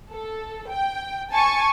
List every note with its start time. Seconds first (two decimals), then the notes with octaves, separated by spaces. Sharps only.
0.12 A4
0.69 G5
1.31 G#5 A5 C#6